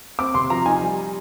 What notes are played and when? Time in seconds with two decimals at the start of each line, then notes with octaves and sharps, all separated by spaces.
0.19 C4 D6
0.34 C3 C6
0.50 F3 A#5
0.66 D#4 G#5
0.81 G3